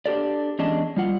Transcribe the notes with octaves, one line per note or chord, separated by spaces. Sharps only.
D4 G4 A4 D5
E2 G#3 C#4 D4 D#5 A5
G3 F4 F#5